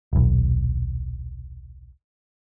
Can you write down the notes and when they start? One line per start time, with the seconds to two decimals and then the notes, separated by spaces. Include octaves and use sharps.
0.13 D#1 B1